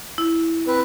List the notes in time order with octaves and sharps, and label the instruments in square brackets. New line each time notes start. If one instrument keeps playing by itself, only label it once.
[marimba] E4
[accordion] C4 B4